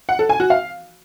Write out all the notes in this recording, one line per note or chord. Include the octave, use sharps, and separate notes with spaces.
F#5
A4
G#5
F#4
F5